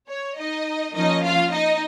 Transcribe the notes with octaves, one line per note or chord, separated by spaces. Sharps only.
C#5
D#4 D#5
F3 A#3 C#4 D#4 D#5
F4 F5
D#4 D#5